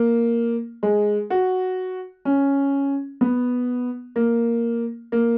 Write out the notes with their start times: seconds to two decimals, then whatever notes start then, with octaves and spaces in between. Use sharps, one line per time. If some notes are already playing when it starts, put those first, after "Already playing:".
Already playing: A#3
0.83 G#3
1.30 F#4
2.25 C#4
3.21 B3
4.16 A#3
5.12 A#3